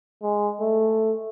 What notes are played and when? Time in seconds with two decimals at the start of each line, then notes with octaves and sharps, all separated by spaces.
0.23 G#3
0.61 A3